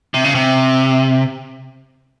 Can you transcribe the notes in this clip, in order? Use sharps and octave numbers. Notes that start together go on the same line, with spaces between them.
C3
C#3
C3